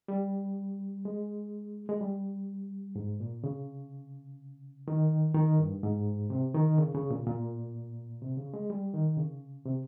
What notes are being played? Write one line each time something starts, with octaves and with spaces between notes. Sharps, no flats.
G3
G#3
G#3
G3
G#2
A#2
C#3
D#3
D#3
G2
G#2
C3
D#3
C#3
C#3
A#2
A#2
C3
C#3
G#3
G3
D#3
C#3
C3